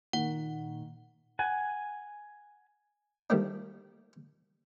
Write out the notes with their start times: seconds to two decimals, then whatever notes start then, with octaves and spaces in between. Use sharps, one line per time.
0.13 A#2 D#3 F#5
1.39 F#5 G#5
3.30 D#3 F3 G3 A3 A#3 D4